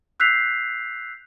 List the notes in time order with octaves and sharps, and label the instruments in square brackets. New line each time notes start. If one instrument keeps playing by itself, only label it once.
[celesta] E6 F#6 G6 B6 C7 F7